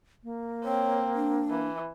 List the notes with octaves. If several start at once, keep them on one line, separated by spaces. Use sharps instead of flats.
A#3
C4 C#5
D4
E3